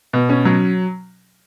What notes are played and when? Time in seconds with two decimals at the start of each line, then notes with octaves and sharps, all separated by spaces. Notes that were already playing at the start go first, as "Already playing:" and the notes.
0.13 B2
0.29 C#4
0.45 F#3